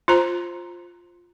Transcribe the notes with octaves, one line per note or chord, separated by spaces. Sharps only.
F4 C5 A#5